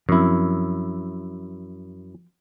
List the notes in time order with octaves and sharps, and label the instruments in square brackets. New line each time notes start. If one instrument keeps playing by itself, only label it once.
[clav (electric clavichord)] F#2 E4 [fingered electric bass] F3 C4